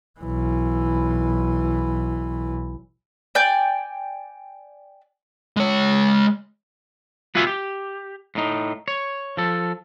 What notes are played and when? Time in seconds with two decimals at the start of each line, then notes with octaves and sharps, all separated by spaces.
0.20 B1 E3
3.35 D5 G5 G#5 G6
5.57 G#3 C#5
7.35 B3 F4 F#4 E5 G#5
7.47 G4
8.35 A2 D#4
8.88 C#5
9.37 F3 A4